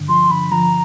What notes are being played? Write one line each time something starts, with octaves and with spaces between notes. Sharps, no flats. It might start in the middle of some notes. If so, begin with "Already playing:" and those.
Already playing: G2 D3
F3 C6
D3 B5
F3 A#5